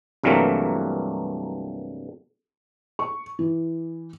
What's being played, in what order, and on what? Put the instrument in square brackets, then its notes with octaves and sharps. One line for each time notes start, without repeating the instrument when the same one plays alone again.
[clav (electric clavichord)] C2 G2 E3 F#3 A3 A#3
[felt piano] C#6
E3